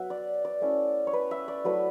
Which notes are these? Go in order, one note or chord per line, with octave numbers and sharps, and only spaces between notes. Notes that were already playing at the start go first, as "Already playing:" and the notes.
Already playing: F#3 B3 E5 F#5
D5
D5
A3 C#4 E4
C#5
B4
E5
D5
F#3 A3 E4 B4